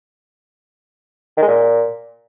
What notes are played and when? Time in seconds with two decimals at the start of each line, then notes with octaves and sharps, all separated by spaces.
1.37 D#3
1.42 G#3
1.48 A#2